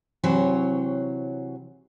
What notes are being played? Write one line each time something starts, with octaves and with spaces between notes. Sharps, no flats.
C3 E3 F#3 C5 C#5